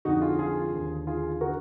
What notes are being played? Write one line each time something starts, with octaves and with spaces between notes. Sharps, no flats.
F2 D3 D#4 F#4
F4 G#4
F4 G#4
D#2 D3
F4 G#4
D3 F#4 A#4